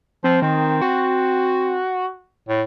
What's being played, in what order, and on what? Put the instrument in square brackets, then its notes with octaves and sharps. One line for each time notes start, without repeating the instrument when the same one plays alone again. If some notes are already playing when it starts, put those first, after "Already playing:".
[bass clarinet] F3 [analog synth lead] C4
[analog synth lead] D#3 [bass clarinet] C4
[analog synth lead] F#4
[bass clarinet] A2